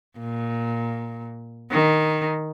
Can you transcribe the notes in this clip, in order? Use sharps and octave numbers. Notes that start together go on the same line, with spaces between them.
A#2
D#3